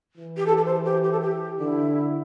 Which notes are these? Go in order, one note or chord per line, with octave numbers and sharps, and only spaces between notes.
E3
G4
A4
A4
C5
G4
G4
A4
G4
D3 E4